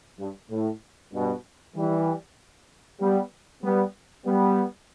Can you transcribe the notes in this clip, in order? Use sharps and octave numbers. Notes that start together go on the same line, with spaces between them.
G2
A2
G2 B2
E3 G3
G3 B3
G3 B3
G3 B3